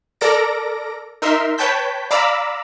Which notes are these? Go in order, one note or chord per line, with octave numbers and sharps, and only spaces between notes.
A4 A#4 D5 A#6 D7
D#4 A#4 E5 C6
B4 C#5 G5 A5 G6 B6
D5 F5 A#5 B5 D6 E6